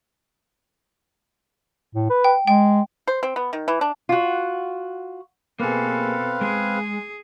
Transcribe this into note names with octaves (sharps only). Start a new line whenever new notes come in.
A2
B4
G5
G#3 G5
C5
C4
B3
D#3
E3
D4
F4 F#4
B2 A#3 C4 G#4 A4 B4 F5
G#3 G#4